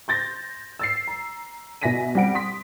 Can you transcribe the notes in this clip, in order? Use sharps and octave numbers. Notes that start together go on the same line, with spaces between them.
C6 G6 A6 A#6
E6 A6 C7
A#5
B2 E5 G#5 A#6 B6 D#7
G3 C4 F#5 D7
C6 D#6 B6